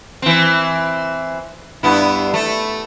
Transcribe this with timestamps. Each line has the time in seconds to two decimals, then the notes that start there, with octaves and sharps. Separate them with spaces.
0.22 E3 C4
1.83 G2 B3 E4
2.34 A3